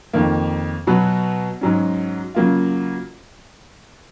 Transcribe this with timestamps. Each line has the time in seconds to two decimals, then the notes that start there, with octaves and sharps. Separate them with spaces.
0.13 F2 D#3 A#3
0.87 B2 F#3 B3 F#4 B4
1.61 G#2 F#3 C#4
2.35 C#3 F#3 A#3 F4